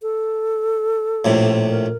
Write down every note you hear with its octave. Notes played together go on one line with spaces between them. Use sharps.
A4
A#1 A2 C3
A#4